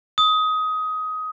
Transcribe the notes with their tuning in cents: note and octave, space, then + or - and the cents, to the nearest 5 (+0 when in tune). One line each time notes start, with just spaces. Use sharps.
D#6 +20